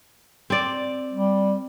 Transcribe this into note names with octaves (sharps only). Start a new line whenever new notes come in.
C4 D5
G3